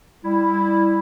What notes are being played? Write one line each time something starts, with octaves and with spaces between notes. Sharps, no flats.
G3 E4